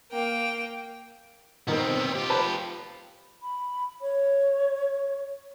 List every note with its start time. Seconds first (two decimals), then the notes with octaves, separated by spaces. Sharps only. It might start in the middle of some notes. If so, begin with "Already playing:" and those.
0.11 A#3 G5
1.68 B2 D#3 B3 C4
2.15 F4 G4
2.30 B4 C5 A5
3.42 B5
4.01 C#5